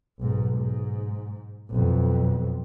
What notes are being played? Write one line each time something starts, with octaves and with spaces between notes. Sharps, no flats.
B1 G#2
G#2
B1 F2